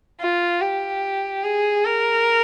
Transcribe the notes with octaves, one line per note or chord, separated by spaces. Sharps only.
F4
G4
G#4
A#4